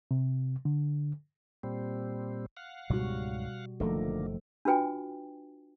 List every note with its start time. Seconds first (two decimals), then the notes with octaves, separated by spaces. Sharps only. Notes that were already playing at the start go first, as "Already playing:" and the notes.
0.11 C3
0.65 D3
1.63 A#2 G3 C4
2.57 F5 F#5
2.90 C#2 G#2 B2 F#3 G3 F#4
3.80 F#1 D3 D#3 F3 A3 A#3 A4
4.65 D4 F4 F#4 B4 G5 G#5